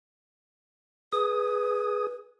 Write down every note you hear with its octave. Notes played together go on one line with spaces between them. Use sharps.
G#4 B4 D#6